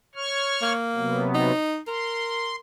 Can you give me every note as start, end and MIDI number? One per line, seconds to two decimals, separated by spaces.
0.15 0.73 73
0.15 0.73 85
0.15 0.73 89
0.62 1.29 58
0.95 1.51 48
0.95 1.51 54
0.95 1.51 59
1.34 1.79 63
1.88 2.60 70
1.88 2.56 84